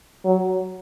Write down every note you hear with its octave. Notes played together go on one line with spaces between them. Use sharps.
F#3